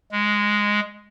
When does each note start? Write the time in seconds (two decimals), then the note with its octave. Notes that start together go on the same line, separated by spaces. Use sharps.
0.12 G#3